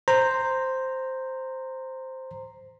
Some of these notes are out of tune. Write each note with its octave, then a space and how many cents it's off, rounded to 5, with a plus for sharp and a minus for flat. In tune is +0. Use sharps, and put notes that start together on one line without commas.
C5 +0 A#5 -10